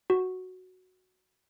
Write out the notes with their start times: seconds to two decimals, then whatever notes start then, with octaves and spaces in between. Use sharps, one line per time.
0.10 F#4